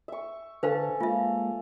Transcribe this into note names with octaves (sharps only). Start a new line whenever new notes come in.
E5 C#6
D3 D4 A4 B4 C5 F5 G#5 A5
G#3 A#3 F4 E5 F5